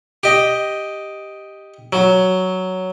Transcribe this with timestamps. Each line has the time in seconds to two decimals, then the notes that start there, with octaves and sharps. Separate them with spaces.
0.23 G4 D#5
1.93 F#3